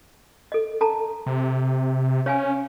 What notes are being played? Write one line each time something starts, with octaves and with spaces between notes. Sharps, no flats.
A4 D#5
A4 A5 A#5
C3
C#4 C#5 F5 G#5